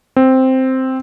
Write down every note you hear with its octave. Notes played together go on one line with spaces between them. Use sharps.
C4